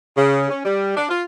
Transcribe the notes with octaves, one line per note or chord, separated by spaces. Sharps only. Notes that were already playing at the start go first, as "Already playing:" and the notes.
C#3
C#4
G3
D4
F4